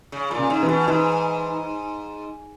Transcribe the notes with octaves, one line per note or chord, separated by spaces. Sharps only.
C#3
A#2
C#3
G#2
E3
B2
G#2 E3